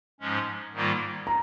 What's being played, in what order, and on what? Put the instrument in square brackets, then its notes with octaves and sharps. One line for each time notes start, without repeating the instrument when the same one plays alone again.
[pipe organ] G#2 F3 G#3 C#4
G#2 D#3 G3 A#3 F4
[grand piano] A#5